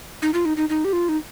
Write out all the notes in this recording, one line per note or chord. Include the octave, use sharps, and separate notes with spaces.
D#4
F4
D#4
D#4
D#4
G4
F4
D#4